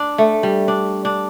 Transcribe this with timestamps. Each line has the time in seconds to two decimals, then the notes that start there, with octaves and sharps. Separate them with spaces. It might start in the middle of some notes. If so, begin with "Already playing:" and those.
Already playing: D4
0.18 A3
0.43 G3
0.68 D4
1.05 D4